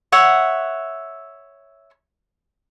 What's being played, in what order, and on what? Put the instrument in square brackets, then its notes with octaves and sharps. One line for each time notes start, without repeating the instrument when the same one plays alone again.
[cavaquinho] C#5 E5 F#5